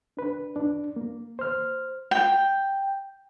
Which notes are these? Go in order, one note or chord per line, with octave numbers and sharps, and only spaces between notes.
D4 B4
D4
A#3
C5 F6
G5